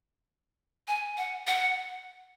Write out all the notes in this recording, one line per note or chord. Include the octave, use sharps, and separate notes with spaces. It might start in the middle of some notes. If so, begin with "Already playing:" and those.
G#5
F#5
F#5